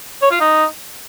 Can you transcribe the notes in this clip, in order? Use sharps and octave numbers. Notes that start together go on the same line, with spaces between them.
C#5
F4
D#4